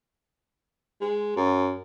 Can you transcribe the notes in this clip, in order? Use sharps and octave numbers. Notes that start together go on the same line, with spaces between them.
G#3
F#2